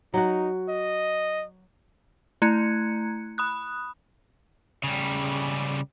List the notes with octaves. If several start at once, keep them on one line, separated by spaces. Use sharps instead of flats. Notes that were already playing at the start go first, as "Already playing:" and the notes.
F#3 D#4 F#4
D#5
A3 E4 A#5 F#6 G#6 C#7
B5 D#6 F#6
C#3 G3